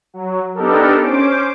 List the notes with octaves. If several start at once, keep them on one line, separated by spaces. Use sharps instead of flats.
F#3
B3 D4 D#4 G4 A4 A#4
C#4 C5 D6